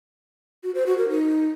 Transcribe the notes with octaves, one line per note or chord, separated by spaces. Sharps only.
F#4
C5
F#4
A#4
D#4